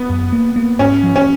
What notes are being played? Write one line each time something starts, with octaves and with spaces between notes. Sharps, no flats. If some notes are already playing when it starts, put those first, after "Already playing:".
Already playing: B3
F#2
A#3
A#3
G#2 C#4
F3
C#4